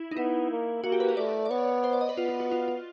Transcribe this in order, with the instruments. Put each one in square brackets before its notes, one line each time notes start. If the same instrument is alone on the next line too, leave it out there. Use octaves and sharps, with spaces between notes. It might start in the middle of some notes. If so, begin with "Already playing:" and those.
Already playing: [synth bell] E4
D#4
[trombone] B3 [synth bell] E4
[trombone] A#3
[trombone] A#3 [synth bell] F#4
[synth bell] G4
B4
A#4
[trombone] A3 [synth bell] D5
[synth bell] D5
[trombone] B3 [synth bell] C#5
[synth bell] C5
D5
D#5
B4
[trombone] B3 [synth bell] F4
[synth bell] F4
F#4
F4
F4